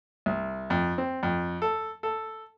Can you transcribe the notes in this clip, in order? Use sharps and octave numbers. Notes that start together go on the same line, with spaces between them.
C2
F2
C4
F2
A4
A4